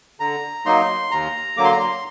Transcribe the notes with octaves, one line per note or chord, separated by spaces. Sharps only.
D3 A#5
F#3 A#3 D#4 C6
D#2 A#5
D3 F#3 A#3 D6
C6
A#5
C6